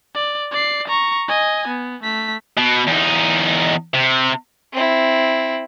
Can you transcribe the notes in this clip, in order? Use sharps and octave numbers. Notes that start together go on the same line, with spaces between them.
D5
D5 C7
A#5 C#6
D#5 G#5
B3
A3 B6
B2
E2 D#4
C3
C4 E4